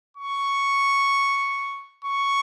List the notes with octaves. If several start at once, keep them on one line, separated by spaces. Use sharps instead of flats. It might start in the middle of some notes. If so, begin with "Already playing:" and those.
C#6
C#6